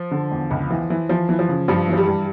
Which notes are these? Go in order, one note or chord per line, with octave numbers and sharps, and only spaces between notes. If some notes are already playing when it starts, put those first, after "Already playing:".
Already playing: F3
D3
E2
C#2
E3
E3
E3 F3
E3
F3
C#3
G2 F3
E3 F3
G3
G2